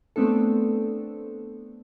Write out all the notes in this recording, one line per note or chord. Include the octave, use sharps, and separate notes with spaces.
A3 B3 C4 D4 A4